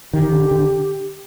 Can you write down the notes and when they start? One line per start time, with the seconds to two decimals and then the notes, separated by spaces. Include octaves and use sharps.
0.13 D#3 G4
0.32 D3
0.51 D3